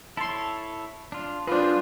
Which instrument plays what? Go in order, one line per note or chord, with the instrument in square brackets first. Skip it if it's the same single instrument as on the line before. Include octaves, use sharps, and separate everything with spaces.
[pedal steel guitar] E4 A4 C#5 [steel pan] A5 C6
[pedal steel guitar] D4 F4
[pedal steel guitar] G3 G#4 [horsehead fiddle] D4 F4 [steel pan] B4 C5